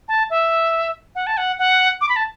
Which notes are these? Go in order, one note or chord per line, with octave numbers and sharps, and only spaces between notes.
A5
E5
F#5
A5
F#5
F#5
D6
B5
A5